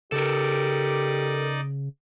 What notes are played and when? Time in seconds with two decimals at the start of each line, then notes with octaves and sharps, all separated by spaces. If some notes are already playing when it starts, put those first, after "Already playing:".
0.12 C#3 D#4 G4 A4 A#4 D5